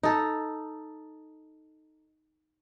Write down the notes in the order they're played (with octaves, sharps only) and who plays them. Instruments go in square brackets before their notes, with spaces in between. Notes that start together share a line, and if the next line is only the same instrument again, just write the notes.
[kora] D#4 A4